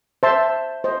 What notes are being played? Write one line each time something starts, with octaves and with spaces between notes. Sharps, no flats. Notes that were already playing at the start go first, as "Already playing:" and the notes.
C5 E5 A5 C6
C5 D#5